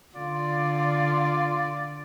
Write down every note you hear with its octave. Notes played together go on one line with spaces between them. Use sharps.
D3 F4 D5